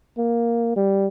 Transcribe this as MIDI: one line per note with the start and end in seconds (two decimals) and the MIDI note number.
0.18 0.74 58
0.76 1.07 55